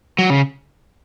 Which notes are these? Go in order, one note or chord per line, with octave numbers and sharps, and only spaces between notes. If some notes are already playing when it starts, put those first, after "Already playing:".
F#3
C#3